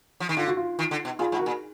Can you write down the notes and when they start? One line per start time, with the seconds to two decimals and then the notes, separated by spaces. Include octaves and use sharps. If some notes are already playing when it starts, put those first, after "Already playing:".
0.20 F3
0.29 D#3
0.37 D3 F4
0.47 F#4
0.57 F4
0.79 D#3
0.91 D3
1.05 B2
1.19 A#2 F4 G#4
1.32 G#2
1.39 F#4 A#4
1.46 A#2